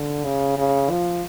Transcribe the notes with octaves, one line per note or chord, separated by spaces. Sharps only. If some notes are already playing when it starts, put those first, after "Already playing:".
Already playing: D3
C#3
C#3
F3